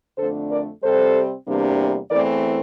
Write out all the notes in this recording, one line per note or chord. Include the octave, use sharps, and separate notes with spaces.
F2 D3 A3 D4 A4 C5
A#4 D5
C3 G3 C4 A4 C5
E2 C3 G3 A#3 D4
E2 E3 A3 C4 A#4 D5